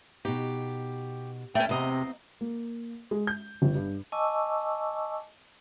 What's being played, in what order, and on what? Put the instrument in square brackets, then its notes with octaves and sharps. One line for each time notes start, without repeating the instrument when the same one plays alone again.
[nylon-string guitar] B2 D#4 [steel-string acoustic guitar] G4
[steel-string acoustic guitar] A3 C#4 [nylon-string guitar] D5 [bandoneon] G5
[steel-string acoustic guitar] E2 D#5 A#5 [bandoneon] C3 [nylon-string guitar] B3 C4
[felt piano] A#3
G#3
G6
G1
G2
[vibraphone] D#5 G#5 A5 C#6 D6 E6